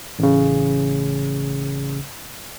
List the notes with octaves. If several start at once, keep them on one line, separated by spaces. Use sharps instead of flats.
A1 C#3